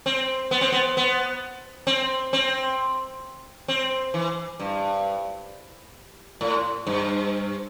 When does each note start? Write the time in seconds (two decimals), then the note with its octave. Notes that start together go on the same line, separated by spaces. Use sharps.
0.06 C4
0.51 B3
0.61 C4
0.72 B3
0.97 B3
1.87 C4
2.33 C4
3.68 C4
4.14 E3
4.60 G2
6.41 A2
6.87 G2